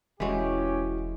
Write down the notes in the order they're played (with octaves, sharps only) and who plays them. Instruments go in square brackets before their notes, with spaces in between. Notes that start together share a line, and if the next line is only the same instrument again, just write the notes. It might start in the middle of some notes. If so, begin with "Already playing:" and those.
[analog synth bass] E1 [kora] E3 G#3 [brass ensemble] C#4 G4 [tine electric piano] E4 F#4